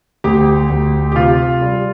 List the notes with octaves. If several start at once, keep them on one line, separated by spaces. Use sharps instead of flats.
D2 G4
D2
G4
C3 F4
G3